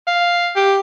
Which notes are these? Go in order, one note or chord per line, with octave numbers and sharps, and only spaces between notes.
F5
G4